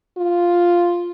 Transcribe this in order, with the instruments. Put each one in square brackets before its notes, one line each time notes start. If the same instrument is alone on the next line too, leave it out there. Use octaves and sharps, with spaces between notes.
[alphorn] F4